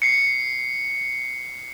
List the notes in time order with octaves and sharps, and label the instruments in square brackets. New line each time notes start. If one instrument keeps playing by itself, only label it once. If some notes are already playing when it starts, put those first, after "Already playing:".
[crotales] C7 C#7